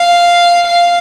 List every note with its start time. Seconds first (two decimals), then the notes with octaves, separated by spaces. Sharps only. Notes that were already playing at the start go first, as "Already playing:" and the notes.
Already playing: F5
0.67 F5